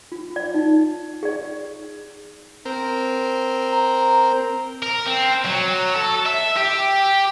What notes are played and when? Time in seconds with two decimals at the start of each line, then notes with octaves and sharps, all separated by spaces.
0.12 F4
0.36 D5
0.54 D#4
1.23 G#4 D5
2.65 C4 A#4
3.72 A#5
4.83 A#4
5.06 C4
5.45 F#3
5.95 A4
6.26 E5
6.56 G4